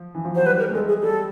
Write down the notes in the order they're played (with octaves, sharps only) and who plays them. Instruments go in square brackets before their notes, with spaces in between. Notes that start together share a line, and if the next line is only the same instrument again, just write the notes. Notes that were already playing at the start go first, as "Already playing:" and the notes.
Already playing: [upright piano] F3
E3
F3
[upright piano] F#3 [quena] C5
[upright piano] G3 [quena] B4
[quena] A#4
[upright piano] A3
[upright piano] G#3 [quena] A4
[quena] G#4
[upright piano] G3 [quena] A4